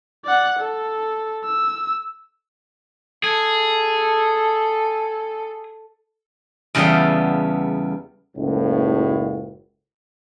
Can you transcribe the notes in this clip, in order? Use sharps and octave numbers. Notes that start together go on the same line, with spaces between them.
D5 F#5
A4
E6
G#4 A4
E2 C#3 G3 B3 A4 F5
F#1 C#2 A2